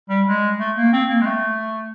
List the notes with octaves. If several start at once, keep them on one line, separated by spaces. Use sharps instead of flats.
G3
G#3
A3
A#3
C4
A#3
G#3
A3